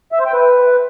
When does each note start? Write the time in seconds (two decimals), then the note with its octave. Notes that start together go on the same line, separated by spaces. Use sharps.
0.12 E5
0.19 C5
0.26 G5
0.33 B4